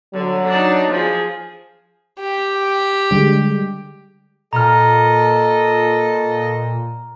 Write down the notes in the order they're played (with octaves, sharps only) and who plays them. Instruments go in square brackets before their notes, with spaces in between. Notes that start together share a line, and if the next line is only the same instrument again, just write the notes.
[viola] D3 [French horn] F#3
[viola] D4 D#4
F3 G#4
[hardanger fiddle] G4
[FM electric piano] D3 G3 G#3
[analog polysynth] A#2 [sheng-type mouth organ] A4 D#5 [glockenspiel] A#5 F6